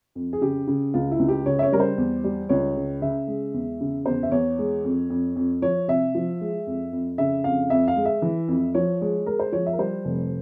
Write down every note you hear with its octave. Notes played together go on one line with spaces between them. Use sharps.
F2
G#4
C#3 G4
C#3
C#2 F4
E4
C#2
G4
C#3 C#5
E5
C#5
G3 A#4
C5
E2
G3
C#2 C#5
C#3
C#3 E5
G#3
E2
C#3
E2 C5
E5
E2 C#5
G#3
F2
F2
F2
F3 C#5
C3 E5
F3
G#3
F2
F2
C#3 E5
F2 F5
F2 E5
F5
G#3
E5
E3
F2
F3 C#5
G#3 C#5
G#3 A#4
C5
F3 C#5
E5
A#4
G3 C5
F1